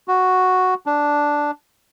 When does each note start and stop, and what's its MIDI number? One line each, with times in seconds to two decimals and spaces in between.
0.08 0.74 66
0.86 1.51 62